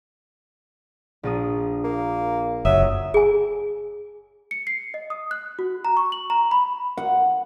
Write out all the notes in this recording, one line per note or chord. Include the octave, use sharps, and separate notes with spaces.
A#1 F4 D#6
A#3
F#1 F#3 E5 D#6
G#4 G#5
C#7
C7
D#5
D#6
F#6
F#4
A#5
C#6
F#7
A#5
B5
F#5